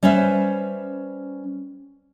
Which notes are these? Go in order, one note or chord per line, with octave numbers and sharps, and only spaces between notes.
G3 C#4 B4 C5 E5